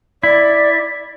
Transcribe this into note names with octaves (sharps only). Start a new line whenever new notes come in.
E4 D5